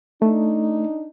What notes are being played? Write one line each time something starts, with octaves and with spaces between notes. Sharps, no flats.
A3 D4 D#4